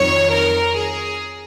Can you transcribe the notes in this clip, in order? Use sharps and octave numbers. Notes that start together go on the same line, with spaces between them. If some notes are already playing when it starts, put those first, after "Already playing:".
Already playing: F2 D#3 F#3 C#5
A#4
G#4